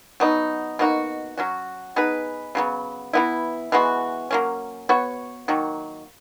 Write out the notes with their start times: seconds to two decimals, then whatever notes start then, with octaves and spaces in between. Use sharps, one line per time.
0.20 F#3 B3 D#4
0.79 B2 A#3 D#4 F#4
1.37 F#3 C#4 F#4
1.96 B3 D#4 G#4 B4
2.55 C#3 F#3 B3
3.13 E3 B3 E4
3.72 E3 G#3 B3 F#4
4.31 F#3 A#3 C#4
4.89 B3 F#4 C#5
5.48 D#3 F#3 A#3